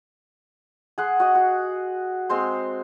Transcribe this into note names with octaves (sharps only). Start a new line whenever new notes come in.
G#4 F#5 C6
F#4 D#5
F#4
G#3 C4 C5 C6